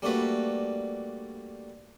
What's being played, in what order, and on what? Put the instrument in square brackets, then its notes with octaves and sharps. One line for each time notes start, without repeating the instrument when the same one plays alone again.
[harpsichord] G3 A3 A#3 D4 F#4 B4